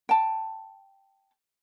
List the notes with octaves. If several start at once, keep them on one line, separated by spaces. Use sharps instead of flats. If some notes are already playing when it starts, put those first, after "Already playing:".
G5 A5